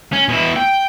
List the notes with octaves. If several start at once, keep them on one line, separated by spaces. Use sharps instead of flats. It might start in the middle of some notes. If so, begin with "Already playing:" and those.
C#4
B2 E4
G5